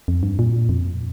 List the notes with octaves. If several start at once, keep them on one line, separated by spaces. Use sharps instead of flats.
F2
G2
A#2
F2